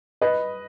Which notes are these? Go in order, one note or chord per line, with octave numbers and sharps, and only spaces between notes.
B4 D#5